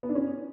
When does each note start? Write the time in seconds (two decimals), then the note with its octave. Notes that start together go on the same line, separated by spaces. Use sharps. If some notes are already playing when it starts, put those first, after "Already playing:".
0.03 B3
0.09 D4
0.15 C#4